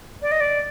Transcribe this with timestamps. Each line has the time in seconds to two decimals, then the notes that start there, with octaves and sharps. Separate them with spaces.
0.22 D5
0.32 D#5
0.41 D5